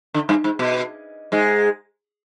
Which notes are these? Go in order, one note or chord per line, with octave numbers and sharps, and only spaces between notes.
D3
G2
G#2
B2
G#2 G#3